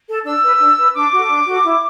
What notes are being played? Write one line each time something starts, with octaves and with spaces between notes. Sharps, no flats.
A4
D4 E6
B4
D4
B4
D4 D6
F#4 A4
D4
F#4 A4
E4